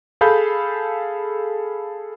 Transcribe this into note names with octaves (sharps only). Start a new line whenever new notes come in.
G#4 A4 F5 B5 G6